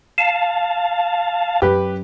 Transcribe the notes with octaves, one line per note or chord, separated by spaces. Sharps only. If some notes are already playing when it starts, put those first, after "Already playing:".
F5 A5
F#2 G4 B4